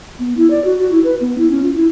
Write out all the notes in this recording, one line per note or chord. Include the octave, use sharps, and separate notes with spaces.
B3
E4
D5
F#4
F#4
E4
B4
B3
E4
C#4
F4
E4